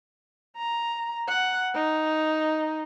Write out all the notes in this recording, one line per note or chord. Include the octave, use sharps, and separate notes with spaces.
A#5
F#5
D#4